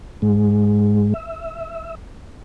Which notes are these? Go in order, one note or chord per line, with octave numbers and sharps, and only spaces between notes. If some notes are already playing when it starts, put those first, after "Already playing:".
G#2 G#3
E5